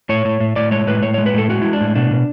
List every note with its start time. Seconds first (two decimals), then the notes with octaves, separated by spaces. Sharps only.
0.09 A2 C#5
0.25 A2
0.40 A2
0.56 A2 D5
0.71 G#3 C#5
0.87 A2 B4
1.02 A2 C#5
1.14 G#3 C#5
1.26 B4
1.34 A2 A4
1.49 G#3 F#4
1.62 G#3 E4
1.73 D4
1.81 A2
1.96 B2 D4
2.11 B2